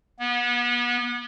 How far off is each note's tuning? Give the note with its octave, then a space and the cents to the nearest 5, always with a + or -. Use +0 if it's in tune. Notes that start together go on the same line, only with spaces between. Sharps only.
B3 -35